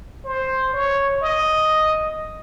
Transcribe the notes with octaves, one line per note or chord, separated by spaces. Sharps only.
C5
C#5
D#5